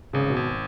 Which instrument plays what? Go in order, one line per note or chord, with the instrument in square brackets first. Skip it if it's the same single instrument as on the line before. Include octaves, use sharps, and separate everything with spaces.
[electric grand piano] G#1 [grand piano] C#3
[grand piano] B2
[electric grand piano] G#1